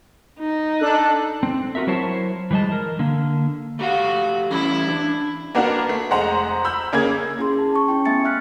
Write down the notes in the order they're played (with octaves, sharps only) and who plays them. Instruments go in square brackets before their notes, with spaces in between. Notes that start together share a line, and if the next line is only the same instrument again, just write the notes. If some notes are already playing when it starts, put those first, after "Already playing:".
[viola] D#4
[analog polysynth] D4 A4 F#6
[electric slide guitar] C4
F4 F#4 A#4 E5
F#3 E4 A#4 C5 C#5 A5
E3 G3 G#3 D#5 A5
A#4
D3 A#3
[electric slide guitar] A3 G4 F5 [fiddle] F#4
[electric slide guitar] E3 G3 C#4 [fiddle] E4
[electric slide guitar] D4
[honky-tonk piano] A#3 B3 D4 F#4 A#4
A3
F1 G#3 C5 F#5 A#5
B5 E6 G6
C#3 A#3 G#4 G#6
[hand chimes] C#4 E4 G#4 C6
A5
C#4 A5 C#6
C#4 E4 G5
A3 B3 E5 G#5 A6 C#7
E5 G#5 F6 F#6 B6 C#7